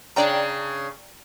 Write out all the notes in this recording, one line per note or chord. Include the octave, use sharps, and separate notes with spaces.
C#3 D4 D5 G5 A#5